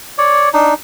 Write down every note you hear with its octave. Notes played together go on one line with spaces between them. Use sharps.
C#5 D5
D4 D#4